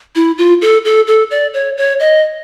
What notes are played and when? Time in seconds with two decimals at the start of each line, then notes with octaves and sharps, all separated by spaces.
0.16 E4
0.38 F4
0.62 A4
0.85 A4
1.07 A4
1.31 D5
1.54 C#5
1.77 C#5
2.00 D#5